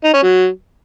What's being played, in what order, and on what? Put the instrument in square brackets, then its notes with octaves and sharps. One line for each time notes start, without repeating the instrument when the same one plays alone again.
[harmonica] D#4
C#4
F#3